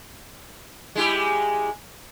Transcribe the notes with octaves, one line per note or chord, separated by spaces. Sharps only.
G#3 E4 G4